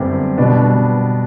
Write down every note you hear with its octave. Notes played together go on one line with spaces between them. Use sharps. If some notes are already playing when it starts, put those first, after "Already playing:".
Already playing: F#2 D3 G3 B3 C4 E4 G4
B2 G3 B3 D4